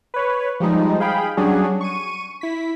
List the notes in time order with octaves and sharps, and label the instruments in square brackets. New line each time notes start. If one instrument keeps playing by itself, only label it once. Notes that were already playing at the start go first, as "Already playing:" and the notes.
[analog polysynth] B4 C#5
F3 G3 G#3 D#4
G#4 F5 G5 B5
F#3 G3 C#4 D4 F#4 G#4
C#6 D#7
E4 B6